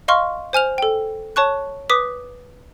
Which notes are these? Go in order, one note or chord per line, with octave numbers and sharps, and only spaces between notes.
D#5 F5 C6 C#6 F6
C5 G#5 F6 F7
A4 G5
C#5 A5 C#6 F#6
B4 D6 D#6 B6